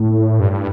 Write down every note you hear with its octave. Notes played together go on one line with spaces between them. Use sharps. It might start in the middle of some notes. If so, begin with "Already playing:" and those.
Already playing: A2
G2